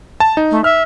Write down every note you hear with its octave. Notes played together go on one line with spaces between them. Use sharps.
A5
D#4
A3
E5 F6